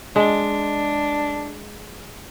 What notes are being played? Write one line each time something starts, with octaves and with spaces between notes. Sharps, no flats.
G#3 D4